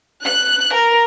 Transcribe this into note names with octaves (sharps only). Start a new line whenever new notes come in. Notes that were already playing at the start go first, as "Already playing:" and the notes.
F#6
A#4